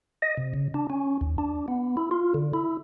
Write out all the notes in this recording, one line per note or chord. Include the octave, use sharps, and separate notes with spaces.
D#5
C3
C#3
D4
C#4
D#2
D4
B3
E4
F4
D3
E4